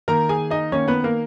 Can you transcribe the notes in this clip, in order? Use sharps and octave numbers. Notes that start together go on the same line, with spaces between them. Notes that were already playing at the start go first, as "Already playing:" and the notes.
D#3 A#3 A#4 A#5
G#4 G#5
D#4 D#5
D#3 A#3 C#4 C#5
B3 B4
A#3 A#4